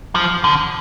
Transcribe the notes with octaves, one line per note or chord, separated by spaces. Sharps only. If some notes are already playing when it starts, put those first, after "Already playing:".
F3
D3